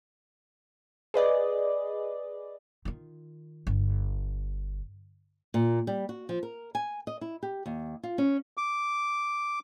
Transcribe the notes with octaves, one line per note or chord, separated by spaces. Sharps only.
G#4 B4 D5 D#5
D#3 F4
G1
A#2
G3
F#4
F3
A#4
G#5
D#5
E4
G4
D#2
F4
C#4
D6